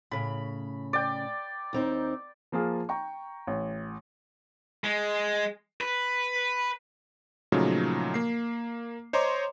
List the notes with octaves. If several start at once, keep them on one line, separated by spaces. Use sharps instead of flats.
A2 C#3 B5
D5 G5
D#2 C4 D#4
F3 A#3 F4 G#4
G5 A#5 C#6
A1
G#3
B4
A#2 C#3 F3 F#3 A3 D#4
A#3 C7
C5 C#5 D#5 A#5 C6 D6